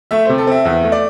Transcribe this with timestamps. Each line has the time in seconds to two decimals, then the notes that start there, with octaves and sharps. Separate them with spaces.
0.11 A3 E5
0.25 C3 C5
0.38 A4
0.47 C4 E5
0.65 E2 E5
0.83 A3
0.92 D5